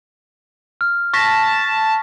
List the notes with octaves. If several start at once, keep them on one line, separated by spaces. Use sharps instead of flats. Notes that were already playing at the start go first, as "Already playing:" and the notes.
F6
A5 C#6 A#6 B6